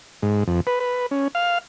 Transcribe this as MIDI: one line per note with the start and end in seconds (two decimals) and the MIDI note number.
0.22 0.44 44
0.47 0.60 41
0.67 0.80 71
0.80 1.06 71
1.11 1.28 61
1.35 1.58 77